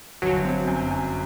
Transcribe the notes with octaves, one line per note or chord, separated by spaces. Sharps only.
G1 F#3
C4
F#2
F#2